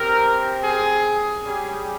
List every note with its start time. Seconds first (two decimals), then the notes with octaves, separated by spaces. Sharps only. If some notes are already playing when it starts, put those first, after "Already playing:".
Already playing: C4 G4 A#4
0.63 G#4
1.45 G3 C#4 G4 G#4